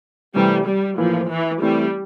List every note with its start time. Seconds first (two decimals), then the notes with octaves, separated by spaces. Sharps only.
0.35 C3 E3 G3 A3 C4
0.67 G3
0.98 A2 E3 F3 A#3 E4
1.30 E3
1.61 E3 G3 A3 C4 E4